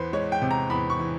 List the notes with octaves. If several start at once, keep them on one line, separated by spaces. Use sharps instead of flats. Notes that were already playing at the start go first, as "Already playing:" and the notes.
Already playing: E2 E3 B4 C5
G#3 C#5
G5
C3
A#5
E2 B5
C#6
E3